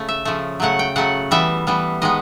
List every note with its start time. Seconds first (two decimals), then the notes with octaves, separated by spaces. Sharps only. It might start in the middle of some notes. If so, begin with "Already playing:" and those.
Already playing: C#3 A3
0.09 E5
0.25 C#3 F3 A3
0.60 C#3 F#3 A3 F#5
0.79 G5
0.96 C#3 F#3 A3 F#5
1.31 E3 G3 B3 E5
1.67 E3 G3 B3
2.02 D#3 G#3 B3 D#5